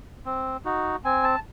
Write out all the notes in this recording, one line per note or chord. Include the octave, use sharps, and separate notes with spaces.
C4
D#4 F#4
C4 G#5
A5